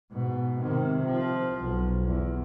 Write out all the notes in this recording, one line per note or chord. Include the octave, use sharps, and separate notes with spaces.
G#2 B2
C3 D#3
F3
B1
E2